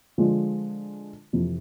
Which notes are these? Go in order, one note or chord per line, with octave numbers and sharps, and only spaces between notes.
D3 F3 G#3
F2 C3 E3